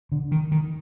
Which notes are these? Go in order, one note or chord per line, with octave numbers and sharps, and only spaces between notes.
D3
D#3
D#3